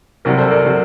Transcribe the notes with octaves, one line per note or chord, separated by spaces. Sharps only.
C2 C3 F#3 A#4 D5
A4 C5
A#4 D5
C3 F#3